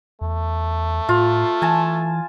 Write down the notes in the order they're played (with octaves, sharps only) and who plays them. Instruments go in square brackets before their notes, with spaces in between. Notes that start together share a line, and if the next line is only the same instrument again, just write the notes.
[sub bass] E2 [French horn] A3
[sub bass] A2 [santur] F4
[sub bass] E3 [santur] G#5 A5